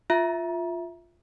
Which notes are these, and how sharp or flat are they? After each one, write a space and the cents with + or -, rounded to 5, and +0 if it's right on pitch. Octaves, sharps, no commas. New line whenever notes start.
F4 +0 E5 +0 A#5 +30